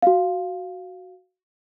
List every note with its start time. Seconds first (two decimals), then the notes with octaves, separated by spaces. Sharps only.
0.02 F#4 F5